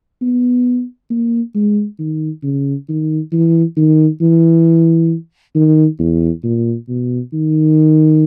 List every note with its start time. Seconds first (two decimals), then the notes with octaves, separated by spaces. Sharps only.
0.22 B3
1.10 A#3
1.55 G#3
1.99 D#3
2.43 C#3
2.89 D#3
3.32 E3
3.77 D#3
4.21 E3
5.55 D#3
5.99 E2
6.44 A#2
6.89 B2
7.33 D#3